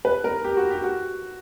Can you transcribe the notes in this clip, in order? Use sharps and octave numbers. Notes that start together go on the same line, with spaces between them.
B4
A#4
G4
F#4
G4
F#4